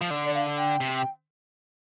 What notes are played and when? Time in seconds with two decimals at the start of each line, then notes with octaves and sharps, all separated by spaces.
0.01 F3
0.10 D3
0.24 D5
0.34 F5
0.57 G5
0.81 C3